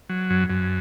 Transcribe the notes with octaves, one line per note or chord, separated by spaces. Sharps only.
F#3
F#2
F#2